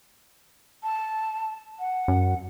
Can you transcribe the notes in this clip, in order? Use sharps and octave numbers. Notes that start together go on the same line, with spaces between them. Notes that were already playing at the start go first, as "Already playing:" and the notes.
A5
F#5
F#2